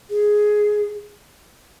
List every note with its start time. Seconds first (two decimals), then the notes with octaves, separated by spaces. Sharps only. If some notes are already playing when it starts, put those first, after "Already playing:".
0.10 G#4